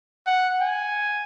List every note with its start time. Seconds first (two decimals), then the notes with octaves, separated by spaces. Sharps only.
0.27 F#5
0.61 G#5